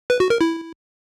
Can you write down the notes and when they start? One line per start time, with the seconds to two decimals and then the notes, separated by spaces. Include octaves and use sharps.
0.10 B4
0.20 F#4
0.30 A#4
0.41 E4